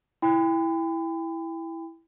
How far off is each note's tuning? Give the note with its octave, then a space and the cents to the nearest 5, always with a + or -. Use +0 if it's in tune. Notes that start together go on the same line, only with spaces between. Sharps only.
E4 +0 G5 +35 B5 +40